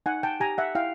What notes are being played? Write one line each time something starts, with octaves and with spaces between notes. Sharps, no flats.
D#4 F#5 G#5
G5 A5
G4 G#5 A#5
E5 F#5
E4 F5 G5